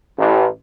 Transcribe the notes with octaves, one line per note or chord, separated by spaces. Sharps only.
A1